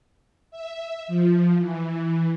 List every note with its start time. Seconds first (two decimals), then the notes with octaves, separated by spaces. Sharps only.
0.51 E5
1.08 F3
1.58 E3